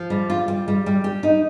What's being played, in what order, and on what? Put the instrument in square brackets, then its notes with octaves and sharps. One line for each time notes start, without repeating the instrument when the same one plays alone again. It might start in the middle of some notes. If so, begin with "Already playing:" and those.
Already playing: [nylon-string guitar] F3
G3
F4
G3
G3
G3
G4
D#4